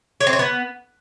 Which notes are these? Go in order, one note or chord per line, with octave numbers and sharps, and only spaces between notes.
C#5
C4
C#5
B3